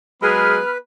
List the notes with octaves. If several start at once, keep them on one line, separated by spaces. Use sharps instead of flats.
F#3 G#3 B3 G#4 B4 B5 F6